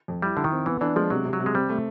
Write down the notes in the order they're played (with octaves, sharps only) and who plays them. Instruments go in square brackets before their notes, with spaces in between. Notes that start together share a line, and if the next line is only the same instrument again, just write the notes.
[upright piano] F2
[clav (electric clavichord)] G3 [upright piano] E4
[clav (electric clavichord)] D3 [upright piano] E4
[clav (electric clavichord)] D#3
[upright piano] C4
[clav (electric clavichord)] E3 [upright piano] B3
[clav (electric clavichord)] E3 [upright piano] D4
[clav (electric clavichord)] F3 [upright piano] G#3
[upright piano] C3 [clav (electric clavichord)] F#3
[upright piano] C3
[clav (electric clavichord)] F#3
[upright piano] C3
[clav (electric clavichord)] G#3
[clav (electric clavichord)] G3 [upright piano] C4
[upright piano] A3